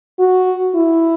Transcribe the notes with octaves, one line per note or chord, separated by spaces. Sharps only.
F#4
E4